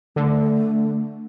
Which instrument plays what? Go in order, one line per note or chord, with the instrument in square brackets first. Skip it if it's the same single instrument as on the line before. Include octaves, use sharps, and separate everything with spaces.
[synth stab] D3 [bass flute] A3